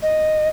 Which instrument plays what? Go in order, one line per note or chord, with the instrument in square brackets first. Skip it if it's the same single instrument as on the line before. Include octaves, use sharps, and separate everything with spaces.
[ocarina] D#5